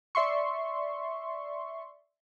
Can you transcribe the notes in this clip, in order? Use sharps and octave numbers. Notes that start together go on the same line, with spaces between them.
D5 E5 C6 C#6